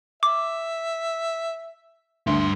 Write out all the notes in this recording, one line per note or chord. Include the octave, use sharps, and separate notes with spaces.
E5 D6
D2 G2 C6